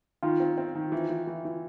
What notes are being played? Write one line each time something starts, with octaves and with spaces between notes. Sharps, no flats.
D#3 F4
C4
C4
D#3
E3
E3
E3
E3